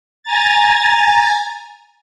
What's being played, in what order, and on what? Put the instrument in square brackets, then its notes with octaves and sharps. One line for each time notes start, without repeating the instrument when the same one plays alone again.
[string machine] G#5 A#5 A6